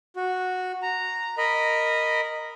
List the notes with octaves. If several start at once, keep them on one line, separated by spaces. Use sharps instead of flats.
F#4
A#5
A#4 D#5 B5